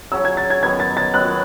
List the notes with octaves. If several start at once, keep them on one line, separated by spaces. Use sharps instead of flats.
C#3 F#3 C#4 E6
G#6
A6
G#6
F#2 D#3 F#3 B3 G#6
A6
A6
F#2 D#3 F#3 B3 F#6